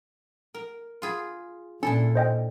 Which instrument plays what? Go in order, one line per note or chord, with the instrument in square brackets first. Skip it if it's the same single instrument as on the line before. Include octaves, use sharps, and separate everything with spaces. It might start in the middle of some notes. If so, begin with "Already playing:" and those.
[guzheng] A#4
F4 G#4 B5
[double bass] A#2 [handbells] C#4 [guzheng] D4 E4 A4
[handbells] C5 D#5 G5